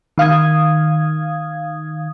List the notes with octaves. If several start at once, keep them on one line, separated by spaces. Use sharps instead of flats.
D#3 F5 D#6 G#6